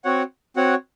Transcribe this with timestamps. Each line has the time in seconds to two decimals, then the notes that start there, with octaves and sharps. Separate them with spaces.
0.04 C4 F#4 C#5 F#5
0.56 C4 F#4 C#5 F#5